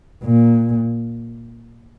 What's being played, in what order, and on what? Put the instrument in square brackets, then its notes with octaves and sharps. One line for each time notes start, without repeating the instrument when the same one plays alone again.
[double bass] A#2